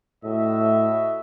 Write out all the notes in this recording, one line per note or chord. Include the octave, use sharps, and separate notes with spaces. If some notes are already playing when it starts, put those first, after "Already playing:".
A2 F#4 D#5 E5